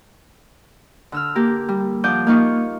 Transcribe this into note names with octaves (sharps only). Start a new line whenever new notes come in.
D3 E6 F6
A#3 G4 A#4
G3
F3 D5 F#5 D#6 G6
A#3 D#4 F4 C#6 D#6